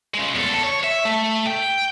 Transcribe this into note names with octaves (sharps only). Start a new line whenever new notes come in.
C#3 G#3
E2 A4
C#5
E5
A3
G5